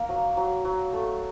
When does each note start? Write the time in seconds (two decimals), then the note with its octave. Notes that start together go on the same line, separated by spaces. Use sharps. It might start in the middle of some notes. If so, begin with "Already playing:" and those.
Already playing: A#3 A#4
0.09 F#3
0.37 F#3
0.65 F#3
0.93 A3